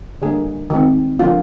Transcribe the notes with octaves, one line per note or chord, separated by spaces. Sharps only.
D3 G3 A#3 G#4
D#3 G#3 C4
D3 F3 A#3 F4